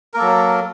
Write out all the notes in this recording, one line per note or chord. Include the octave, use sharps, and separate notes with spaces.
F#3 A#3 A4 A#4